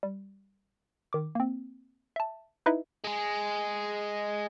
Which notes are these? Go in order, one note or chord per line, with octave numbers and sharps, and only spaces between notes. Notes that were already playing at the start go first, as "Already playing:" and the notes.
G3
D#3 D6
A#3 C4
E5 A5
D#4 E4 B4 D#5 E5
G#3 G#4